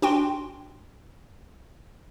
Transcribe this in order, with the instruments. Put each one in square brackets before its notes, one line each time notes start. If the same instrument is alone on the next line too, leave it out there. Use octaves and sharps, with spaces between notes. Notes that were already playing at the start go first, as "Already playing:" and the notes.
[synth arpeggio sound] D4 F#4 G5 C6